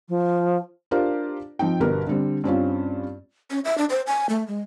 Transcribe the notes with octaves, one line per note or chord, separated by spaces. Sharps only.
F3
D4 F4 G4 A#4 C5 D5
F3 C4 D#4 G5
G1 B2 B3 G4 A#4
D3 G3 C4
G2 C4 C#4 F4
C#4
E5
D4
C5
G#5
A3
G#3